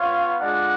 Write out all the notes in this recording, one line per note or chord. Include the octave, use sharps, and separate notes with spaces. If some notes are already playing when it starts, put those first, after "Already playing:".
Already playing: B3 F4 C#5 F5
G#3 D4 F4 D5 F#5